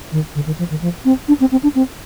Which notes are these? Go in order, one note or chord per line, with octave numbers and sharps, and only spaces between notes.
D#3
D3
D#3
F3
D#3
F3
C4
D4
C4
C4
D4
C4